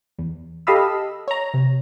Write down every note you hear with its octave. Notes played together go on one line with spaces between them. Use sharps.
E2
G4 A4 D#5 F5 B5 E6
C#5 A#5
C3